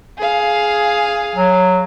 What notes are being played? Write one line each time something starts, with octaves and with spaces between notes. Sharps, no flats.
G#4 F5
F#3